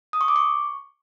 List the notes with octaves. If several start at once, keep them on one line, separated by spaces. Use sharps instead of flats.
D#6
C#6
D6
C#6